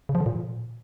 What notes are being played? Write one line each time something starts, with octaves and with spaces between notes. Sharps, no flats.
C#3
F3
D3
A#2